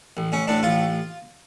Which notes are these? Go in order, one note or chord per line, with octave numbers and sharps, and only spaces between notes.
A1
A1 C#4
A2 D4
A1 F4